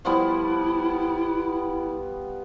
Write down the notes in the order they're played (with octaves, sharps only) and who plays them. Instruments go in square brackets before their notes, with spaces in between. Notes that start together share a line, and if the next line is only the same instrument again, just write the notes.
[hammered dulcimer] F3 G3 B3 [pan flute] E4